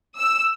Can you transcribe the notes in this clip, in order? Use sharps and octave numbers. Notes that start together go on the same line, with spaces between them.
E6